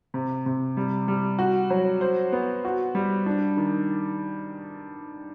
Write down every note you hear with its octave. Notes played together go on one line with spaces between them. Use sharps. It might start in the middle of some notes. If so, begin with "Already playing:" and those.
C3
C3
G3
G3
F#4
F#3
C5
B3
F#4
G3
D4
D#3